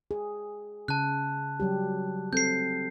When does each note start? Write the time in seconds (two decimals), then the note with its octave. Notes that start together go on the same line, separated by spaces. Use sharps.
0.11 G#4
0.88 C#3 A5 F#6
1.60 F#3 G3 G4
2.33 C4 A4 G6 C7